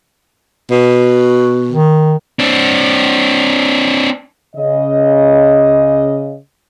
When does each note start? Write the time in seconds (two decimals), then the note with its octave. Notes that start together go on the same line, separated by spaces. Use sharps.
0.71 B2
1.72 D#3
2.39 C4 D4
4.55 C#3 D#5